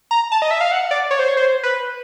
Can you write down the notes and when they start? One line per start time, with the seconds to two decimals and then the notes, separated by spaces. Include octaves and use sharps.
0.11 A#5
0.32 A5
0.42 D#5
0.51 E5
0.61 F5
0.71 F#5
0.91 D5
1.11 C#5
1.19 C5
1.28 C#5
1.37 C5
1.63 B4